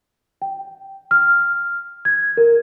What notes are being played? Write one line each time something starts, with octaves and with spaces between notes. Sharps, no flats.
G5
F6
G#6
A#4